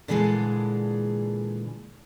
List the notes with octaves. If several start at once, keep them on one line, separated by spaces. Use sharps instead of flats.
A#2 D3 E3 G#3 G#4 A4